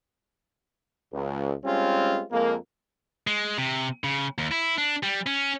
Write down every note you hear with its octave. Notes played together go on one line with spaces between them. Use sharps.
C#2
G3 G#3 C4 C#4 F4
F2 G#3 A#3
G#3
C3
C#3
D#2
E4
D4
G3
C#4